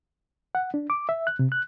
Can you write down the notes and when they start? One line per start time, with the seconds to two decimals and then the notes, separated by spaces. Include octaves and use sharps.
0.55 F#5
0.74 D4
0.90 D6
1.09 E5
1.27 F#6
1.39 C3
1.52 F#6